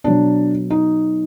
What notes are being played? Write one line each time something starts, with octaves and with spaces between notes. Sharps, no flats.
B2 F#3 D4
D#4